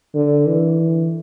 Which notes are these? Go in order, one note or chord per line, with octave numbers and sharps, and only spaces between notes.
D3
E3